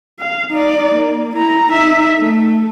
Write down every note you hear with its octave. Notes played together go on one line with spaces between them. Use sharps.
F5
D#4 D5
A#3
E4 A#5
D#4 E5
A3